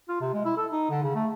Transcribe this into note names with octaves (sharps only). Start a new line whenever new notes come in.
F4
C3
G#3
E4
A4
D#4
D3
C#3
A3